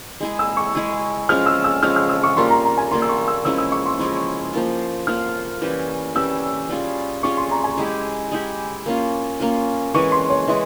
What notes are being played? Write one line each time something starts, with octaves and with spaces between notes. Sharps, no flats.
G#3 E4 G#4
E6
C#6
G#3 E4 G#4
F3 G#3 C#4 F6
E6
E6
F3 G#3 C#4 F6
F6
E6
C#6
G3 A#3 F4 A#4 C6
A#5
A#5
G#5
G3 A#3 F4 A#4 C6
E6
C#6
E6
F3 G#3 C#4 E4 E6
E6
C#6
C6
F3 G#3 C#4 E4
F3 A#3 F4
F3 A#3 F4 F6
E3 G3 C#4 G4
E3 G3 C#4 G4 E6
G3 C#4 F4 G#4
G3 C#4 F4 G#4 C#6
C6
A#5
G#5
G#3 E4 G4
G#3 E4 G4
A#3 C#4 F4
A#3 C#4 F4
E3 G#3 C#4 C#6
C6
C#5
E3 G#3 E5